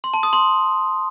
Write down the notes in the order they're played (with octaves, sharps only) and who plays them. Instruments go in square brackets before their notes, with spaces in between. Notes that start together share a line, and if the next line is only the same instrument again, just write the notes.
[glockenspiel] C6
A5
D#6
C6